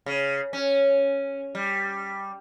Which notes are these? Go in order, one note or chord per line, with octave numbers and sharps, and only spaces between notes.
C#3
C#4
G3